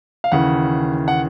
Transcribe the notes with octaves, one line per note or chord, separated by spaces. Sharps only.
F5
D#2 C#3 E3 F#5
F#5